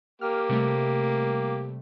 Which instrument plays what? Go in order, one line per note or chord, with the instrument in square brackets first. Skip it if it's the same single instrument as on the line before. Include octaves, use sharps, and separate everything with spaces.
[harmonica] A#3 G4 [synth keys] F6
[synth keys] C3 G3 A3